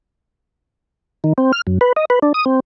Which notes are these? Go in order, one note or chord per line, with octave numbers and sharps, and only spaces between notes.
D#3
C4
F6
F#2
B4
D#5
B4
D4
D#6
C4